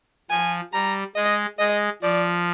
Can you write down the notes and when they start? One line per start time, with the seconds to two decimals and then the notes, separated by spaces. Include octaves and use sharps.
0.30 F3 G#5
0.73 G3 A#5
1.16 G#3 D#5
1.59 G#3 D#5
2.02 F3 D5